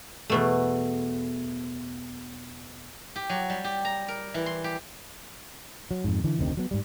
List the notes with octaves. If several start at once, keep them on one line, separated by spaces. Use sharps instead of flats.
E2 B2 A3
G4
F#3
G3
G4
A#5
A#4
E3
C6
G4
F#3
F2 G#2
D3 E3
F1 D2 D#3 C4
F#3 B3
G#2 G3